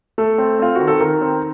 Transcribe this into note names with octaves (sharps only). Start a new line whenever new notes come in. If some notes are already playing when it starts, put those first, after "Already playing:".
A3 A4
C4
C4 F4
D#3 F#4
A4
D#3 A#4
C4